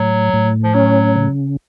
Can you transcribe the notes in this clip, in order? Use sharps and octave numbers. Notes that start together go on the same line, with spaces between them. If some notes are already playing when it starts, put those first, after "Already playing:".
Already playing: A2 F#3
A2
F3
F#3 C#4
C#3